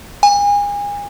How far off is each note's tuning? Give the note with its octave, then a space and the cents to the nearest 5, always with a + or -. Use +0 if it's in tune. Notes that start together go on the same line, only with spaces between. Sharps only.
G#5 -30